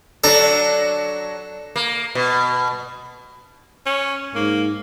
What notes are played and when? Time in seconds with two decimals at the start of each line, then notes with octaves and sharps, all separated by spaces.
0.24 F#3 D4 A4 A#5
1.76 A#3
2.15 B2
3.86 C#4
4.35 G#2 A#3